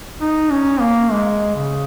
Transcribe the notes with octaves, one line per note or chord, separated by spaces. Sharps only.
D#4
C#4
A#3
G#3
C#3